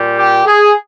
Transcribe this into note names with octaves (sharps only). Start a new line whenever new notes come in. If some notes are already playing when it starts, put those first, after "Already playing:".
Already playing: A#2 G3
G4
G#4